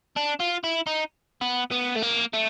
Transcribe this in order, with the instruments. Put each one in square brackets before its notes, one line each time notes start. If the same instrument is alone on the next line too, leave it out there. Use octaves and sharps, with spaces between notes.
[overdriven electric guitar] D4
F4
E4
D#4
B3
B3
A3
A#3
A3